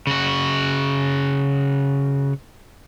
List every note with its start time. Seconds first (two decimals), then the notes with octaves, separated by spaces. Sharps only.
0.07 C#3 F#4